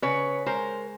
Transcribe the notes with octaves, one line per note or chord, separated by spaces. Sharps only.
C#3 B4 C#5
G#3 A#4 C5